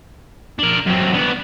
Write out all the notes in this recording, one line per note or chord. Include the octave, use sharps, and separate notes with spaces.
D4 A#4
F#2 C4
B3 D4